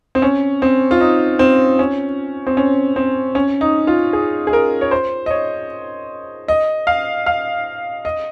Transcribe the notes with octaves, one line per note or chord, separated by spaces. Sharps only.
C4
C#4
C4
F4
D#4
C4
C#4
C4
C#4
C4
C#4
D#4
F4
G#4
G#4
A#4
C#5
C5
D#5
C#5
D#5
F5
F5
D#5